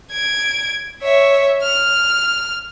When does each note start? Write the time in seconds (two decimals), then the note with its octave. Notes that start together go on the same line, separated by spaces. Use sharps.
0.12 G#6 D7
1.02 C#5 E5
1.62 F6